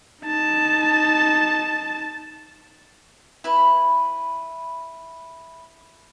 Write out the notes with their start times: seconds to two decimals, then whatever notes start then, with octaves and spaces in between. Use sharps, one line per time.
0.23 D#4 A5
3.44 E4 B4